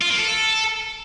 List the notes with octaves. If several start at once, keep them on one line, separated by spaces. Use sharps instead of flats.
F4
A#3
A4